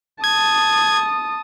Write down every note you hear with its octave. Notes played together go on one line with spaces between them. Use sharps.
A5 D#6 G#6